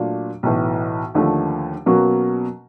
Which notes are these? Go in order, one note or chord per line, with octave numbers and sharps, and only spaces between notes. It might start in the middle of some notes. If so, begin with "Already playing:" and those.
Already playing: A#2 F#3 A3 D4 F4
B1 A2 E3
D#2 D3 F3 A3
B2 F#3 A#3 C#4 F#4